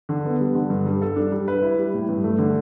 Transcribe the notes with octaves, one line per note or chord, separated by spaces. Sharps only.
D3
B3
G3
D3
G2
G3
A4
D4
G3
B4
E4
G3
A2
G2
A3
D3